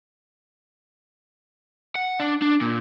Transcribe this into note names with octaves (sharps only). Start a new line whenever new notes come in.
F#5
D4
D4
A#2